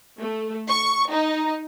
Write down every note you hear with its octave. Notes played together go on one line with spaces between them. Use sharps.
A3
C#6
D#4